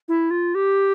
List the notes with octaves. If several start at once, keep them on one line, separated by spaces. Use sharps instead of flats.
E4
F4
G4